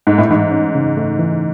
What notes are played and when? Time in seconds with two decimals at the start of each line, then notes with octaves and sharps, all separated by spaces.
0.07 G#2 A3
0.18 A2
0.30 G#2 E3
0.51 C#4
0.75 C#3
0.97 A3
1.19 E3